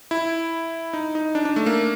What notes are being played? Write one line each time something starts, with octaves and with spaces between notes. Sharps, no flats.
E4
D#4
D#4
D4
D4
A3
A#3